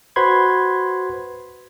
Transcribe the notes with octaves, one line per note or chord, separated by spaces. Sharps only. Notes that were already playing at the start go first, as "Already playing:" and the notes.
F#4 B4 C5 B5 C6 G#6